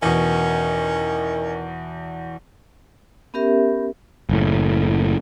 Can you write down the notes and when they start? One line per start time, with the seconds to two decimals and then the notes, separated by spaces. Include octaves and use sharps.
0.02 E2 B2 D#3 C#4
3.34 B3 C#4 G4 A#4 E5
4.29 F#1 A2